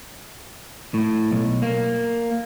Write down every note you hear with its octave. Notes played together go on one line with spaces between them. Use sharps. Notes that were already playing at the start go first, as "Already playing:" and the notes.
A2
B1
A#3